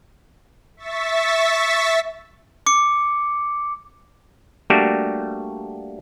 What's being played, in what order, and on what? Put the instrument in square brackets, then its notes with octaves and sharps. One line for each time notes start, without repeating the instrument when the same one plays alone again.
[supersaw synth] E5 C#6 A6 B6
[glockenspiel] D6 C#7
[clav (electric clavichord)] G3 A3 A#3 D4 F#4 G4